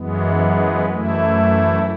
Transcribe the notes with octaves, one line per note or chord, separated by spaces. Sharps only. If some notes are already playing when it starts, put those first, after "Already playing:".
Already playing: F#2 E3 G#3 B3
F#2 E3 A3 E4